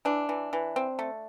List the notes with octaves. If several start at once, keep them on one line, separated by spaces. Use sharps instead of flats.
E3 D4
E3
E3
C4
A3